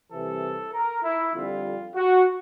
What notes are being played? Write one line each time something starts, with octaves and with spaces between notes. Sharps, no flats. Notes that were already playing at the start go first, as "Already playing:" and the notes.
C2 C3 E3 A4
A#4
E4
F2 D3 G3 F4
F#4